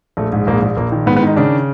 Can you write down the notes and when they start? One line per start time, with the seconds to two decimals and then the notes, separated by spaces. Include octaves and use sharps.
0.17 A#1 A3
0.32 G#2
0.47 A#1 A#3
0.62 A#1
0.77 A#1 A#3
0.92 D#3
1.06 G#2 B3
1.17 B3
1.22 D#3 D#4
1.36 C#3 D4